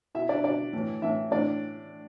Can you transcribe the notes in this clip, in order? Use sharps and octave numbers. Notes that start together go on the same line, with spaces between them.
B2 E4 E5
D4 D5
B2 D4 D5
A2 E3
A2 E3 E4 E5
A2 E3 D4 D5